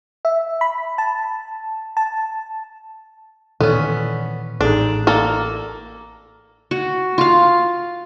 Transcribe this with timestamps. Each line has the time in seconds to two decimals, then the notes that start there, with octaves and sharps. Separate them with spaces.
0.25 E5
0.61 B5
0.98 A5
1.97 A5
3.61 A#2 D#3 E3 B3 C#4 A4 C#5 D5
4.61 A1 D4 D#4 G#4 A4
5.07 A#3 A4 D5 A5 A#5
6.71 F#4
7.18 F4 F5